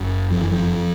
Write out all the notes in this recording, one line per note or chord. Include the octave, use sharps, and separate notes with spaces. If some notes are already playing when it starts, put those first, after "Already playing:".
Already playing: F#1
F2 F3
E3
F3